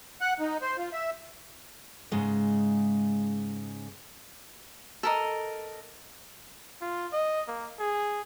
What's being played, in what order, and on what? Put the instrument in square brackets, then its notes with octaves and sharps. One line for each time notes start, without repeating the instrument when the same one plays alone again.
[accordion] F#5
D#4
C5
F4
E5
[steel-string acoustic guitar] G#2 C#3 G#3
[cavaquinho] A4 A#4 D#5
[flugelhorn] F4
D#5
A#3
G#4